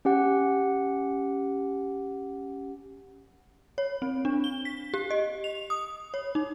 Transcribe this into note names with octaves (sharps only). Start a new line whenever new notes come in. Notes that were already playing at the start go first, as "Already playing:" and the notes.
C#4 G4 F#5
C#5
C4
D4
G7
B6
G4
D#5
F7
D#6
C#5
D#4